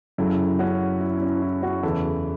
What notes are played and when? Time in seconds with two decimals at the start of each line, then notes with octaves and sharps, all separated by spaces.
0.18 F#2 C#3 F#3 E4 A4
0.59 C#4 F#4
1.01 E4
1.17 E4
1.22 C#4
1.42 E4
1.62 C#4 F#4
1.83 E2 C#3 E3 E4 A4